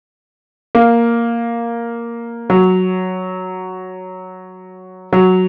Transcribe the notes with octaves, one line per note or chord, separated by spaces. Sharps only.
A#3
F#3
F#3